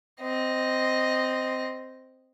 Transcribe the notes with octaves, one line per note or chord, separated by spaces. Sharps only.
C4 D#5